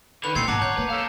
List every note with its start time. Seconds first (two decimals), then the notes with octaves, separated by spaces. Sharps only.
0.24 D3 D#3 B4 F7
0.35 E2 A#2 A3 C4 G#6 C7 C#7
0.48 G#1 B2 F#5 A5 A#5 D6
0.62 D3 C#5 G6
0.78 A#3 B4
0.90 A4 C#5 F5